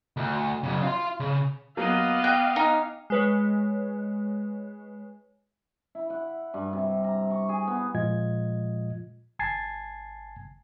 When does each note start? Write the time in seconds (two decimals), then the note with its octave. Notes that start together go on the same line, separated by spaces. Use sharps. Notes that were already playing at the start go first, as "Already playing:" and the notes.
0.17 D2
0.63 F#2 C#3
0.83 F5 C6
1.20 C#3
1.77 F#3 A#3 B3 D#5 F5 D6
2.24 F#5 G5 F#6
2.56 D#4 G#5
3.10 G#3 B4 C#5
5.95 E4
6.10 F#5
6.54 G2
6.73 C3
7.04 A#5
7.31 C#6
7.49 G#4
7.68 B3
7.95 A#2 F3 G#3 F4 D#5 G#6
9.39 G#1 G#5 A5 G#6 A6 C7